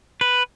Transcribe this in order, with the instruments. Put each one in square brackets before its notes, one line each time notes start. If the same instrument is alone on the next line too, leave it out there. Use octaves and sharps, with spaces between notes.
[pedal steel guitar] B4